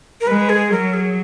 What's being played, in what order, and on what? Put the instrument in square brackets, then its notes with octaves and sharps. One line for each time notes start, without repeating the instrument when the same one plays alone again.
[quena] A#4
[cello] G#3 [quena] B4
[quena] G#4
[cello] F#3 [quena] A#4
[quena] G#4